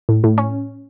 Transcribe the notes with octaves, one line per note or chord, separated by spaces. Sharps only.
A2
A2
C#4